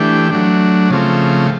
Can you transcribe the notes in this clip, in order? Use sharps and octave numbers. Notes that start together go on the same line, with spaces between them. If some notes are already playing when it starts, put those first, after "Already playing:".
Already playing: E3 A3 D4 G4
F#3 A3 D4
C#3 F3 A3 C4